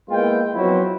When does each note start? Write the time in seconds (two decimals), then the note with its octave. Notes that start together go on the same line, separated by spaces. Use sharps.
0.10 G#3 A#3 B3 E4 F4 G5
0.55 F3 F#3 B3 C4 E4 F#4